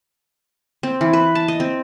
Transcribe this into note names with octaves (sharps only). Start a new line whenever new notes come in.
C4
E3
B4
A5
D#5
C4